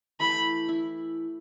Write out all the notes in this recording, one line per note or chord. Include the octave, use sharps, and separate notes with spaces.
E3 A3 E4 G4 B5
E4